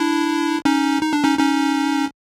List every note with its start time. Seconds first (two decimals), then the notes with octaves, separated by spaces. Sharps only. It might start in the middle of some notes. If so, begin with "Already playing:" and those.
Already playing: D4 E4
0.65 C#4 D#4
1.02 D#4
1.13 D4
1.24 C#4 D#4
1.38 C#4 D#4